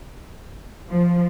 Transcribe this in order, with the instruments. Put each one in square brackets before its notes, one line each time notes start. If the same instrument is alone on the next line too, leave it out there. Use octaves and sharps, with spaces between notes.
[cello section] F3